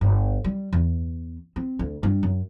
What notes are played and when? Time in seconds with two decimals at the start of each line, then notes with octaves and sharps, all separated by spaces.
0.01 G1
0.44 G3
0.73 E2
1.56 C4
1.79 D2
2.03 G2
2.23 F#2